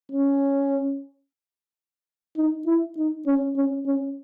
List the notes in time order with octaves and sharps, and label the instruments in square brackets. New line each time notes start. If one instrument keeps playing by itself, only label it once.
[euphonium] C#4
D#4
E4
D#4
C#4
C#4
C#4